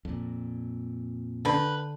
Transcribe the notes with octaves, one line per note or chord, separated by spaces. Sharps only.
F2 A#2
D3 B4 G5